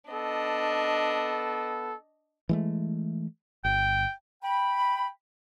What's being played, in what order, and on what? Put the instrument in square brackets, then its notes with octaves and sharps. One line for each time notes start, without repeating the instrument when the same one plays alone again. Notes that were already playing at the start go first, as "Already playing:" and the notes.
[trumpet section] B3 A4 [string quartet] D4 D#5
[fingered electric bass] E3 G#3 A3
[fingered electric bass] G1 [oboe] G5
[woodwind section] G5 B5